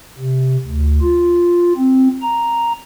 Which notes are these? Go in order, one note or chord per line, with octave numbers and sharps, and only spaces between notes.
C3
D2
F4
C4
A#5